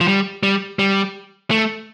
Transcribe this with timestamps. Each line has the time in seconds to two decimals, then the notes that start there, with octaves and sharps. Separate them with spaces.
0.01 F3
0.08 G3
0.43 G3
0.79 G3
1.51 A3